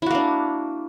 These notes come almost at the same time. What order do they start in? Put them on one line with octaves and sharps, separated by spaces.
E4 F#4 A#3 D4